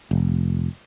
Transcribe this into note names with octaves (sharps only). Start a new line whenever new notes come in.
F1